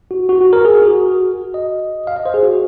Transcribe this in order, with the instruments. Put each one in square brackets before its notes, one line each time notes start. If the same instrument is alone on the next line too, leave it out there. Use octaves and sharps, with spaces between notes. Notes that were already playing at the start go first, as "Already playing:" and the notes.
[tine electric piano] F#4
F#4
F#4
A#4
G#4
F#4
D#5
F5
D#5
C5
G#4
F#4